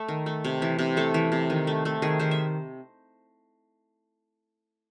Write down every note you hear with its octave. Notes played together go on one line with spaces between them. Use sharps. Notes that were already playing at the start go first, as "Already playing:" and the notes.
Already playing: A3
D#3
A3
C3
E3
C3
A3 A4
E3
C3
D#3
A3
A3
D#3 G#4
D#3 C5
E5